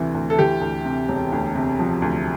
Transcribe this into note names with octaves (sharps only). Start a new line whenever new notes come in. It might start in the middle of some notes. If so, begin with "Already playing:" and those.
Already playing: D2 C3 E3
D2
A4
E3 G4
D2
C3
E1
D2
C3
F3
D2